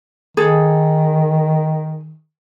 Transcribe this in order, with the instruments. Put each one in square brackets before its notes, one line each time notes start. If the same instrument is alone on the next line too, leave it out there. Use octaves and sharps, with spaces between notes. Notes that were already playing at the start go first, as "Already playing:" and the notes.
[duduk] D#3 [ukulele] G#4 A4